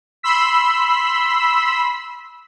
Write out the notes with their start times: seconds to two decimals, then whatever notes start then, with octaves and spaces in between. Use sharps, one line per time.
0.23 B5 C6 E6 B6